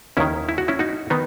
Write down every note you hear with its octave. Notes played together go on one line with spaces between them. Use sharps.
D#2 D#3 C#4 E4
E4
F#4
C#4 E4
D#4 F#4
D#3 B3 D#4